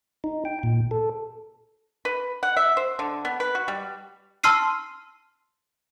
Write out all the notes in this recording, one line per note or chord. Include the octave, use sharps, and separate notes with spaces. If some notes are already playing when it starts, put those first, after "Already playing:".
D#4
G5
A#2
A4
B4
F#5
E5
C5
D3
B3
B4
F#4
G3
A5 C6 E6 F6 C7 D#7